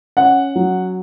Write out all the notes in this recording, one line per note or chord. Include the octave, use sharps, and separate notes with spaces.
C#4 F#5
F#3